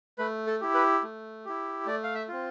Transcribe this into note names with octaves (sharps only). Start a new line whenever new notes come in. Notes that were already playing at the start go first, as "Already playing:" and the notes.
A3 B4
A4
E4 G4
B4
A3
E4 G4
A3 D5
F5
E5
C4 F4